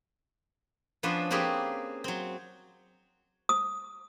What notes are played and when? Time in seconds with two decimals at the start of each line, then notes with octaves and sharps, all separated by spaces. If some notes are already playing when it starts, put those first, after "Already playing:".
1.03 F3 B3 C#4 D4 B4 C5
1.31 A#3 C4 C#4 G4 G#4 B4
2.04 F#3 C4
3.49 D#6